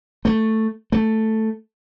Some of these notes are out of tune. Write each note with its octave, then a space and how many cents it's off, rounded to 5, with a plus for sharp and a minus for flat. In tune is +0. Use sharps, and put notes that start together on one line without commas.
A3 +5
A3 +5